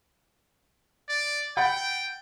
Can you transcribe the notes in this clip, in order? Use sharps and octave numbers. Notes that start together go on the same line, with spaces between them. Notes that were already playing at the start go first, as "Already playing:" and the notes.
D5
F#5 G5 B5 A6